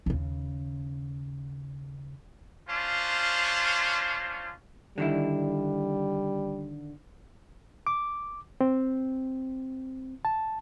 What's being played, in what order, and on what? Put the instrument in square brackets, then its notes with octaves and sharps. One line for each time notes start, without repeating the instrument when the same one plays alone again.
[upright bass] D#2 C#3
[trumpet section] C#4 D4 F4 C5
[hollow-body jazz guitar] D3 D#3 E4 [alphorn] G3
[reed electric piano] D6
C4
A5